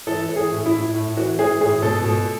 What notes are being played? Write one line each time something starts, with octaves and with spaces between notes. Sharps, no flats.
E3 A4
E3
G#4
A2
E4
A2
A2
E3 F#4
E3 G#4
A2 G#4
B2 A4
B2